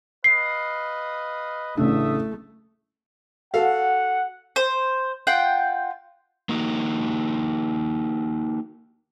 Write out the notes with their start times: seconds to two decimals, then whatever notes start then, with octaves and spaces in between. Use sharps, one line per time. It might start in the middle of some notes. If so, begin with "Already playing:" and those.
0.24 B4 D#5 F5 C7
1.77 A1 C#3 A3 D4 E5 D#6
3.54 F#4 A4 F5 F#5
4.56 C5
5.27 F4 F#5 G5
6.49 A#3 D#4 F#4